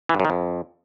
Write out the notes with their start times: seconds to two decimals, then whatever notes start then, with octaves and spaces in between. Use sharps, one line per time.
0.09 E3
0.14 G2
0.20 F#2
0.25 D#3
0.30 F2